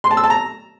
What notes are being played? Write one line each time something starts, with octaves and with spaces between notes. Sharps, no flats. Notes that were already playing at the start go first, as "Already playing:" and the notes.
C6
A5
E6
A5
A#5